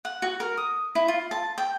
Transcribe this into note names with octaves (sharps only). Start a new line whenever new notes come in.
F#5
F#4
A#4
D#6
E4
F4
A5
G5